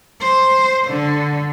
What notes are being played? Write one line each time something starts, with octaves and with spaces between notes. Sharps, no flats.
C5
D3